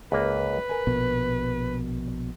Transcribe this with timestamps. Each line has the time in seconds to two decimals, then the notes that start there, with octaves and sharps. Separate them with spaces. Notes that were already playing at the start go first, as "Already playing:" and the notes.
0.12 C#2 A#3 B4
0.69 A#4 G#5
0.87 A#1 B2